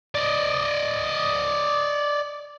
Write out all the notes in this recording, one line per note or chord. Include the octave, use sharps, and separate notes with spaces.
D5 D#5